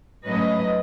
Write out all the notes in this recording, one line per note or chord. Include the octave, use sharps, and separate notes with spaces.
G#2 F#3 A3 C#4 B4 D#5